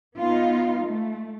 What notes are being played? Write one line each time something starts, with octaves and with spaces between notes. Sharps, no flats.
B3 D#4 F4
A3